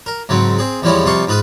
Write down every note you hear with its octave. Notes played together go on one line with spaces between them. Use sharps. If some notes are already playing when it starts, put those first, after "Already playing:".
A#4
G#2 C#3 F#3 C4
C4 G#4
E2 F3 G3 G#3 E4 C#5
F2 C3 G3 F4 C6 C#6
G#2 F4 B4 D#6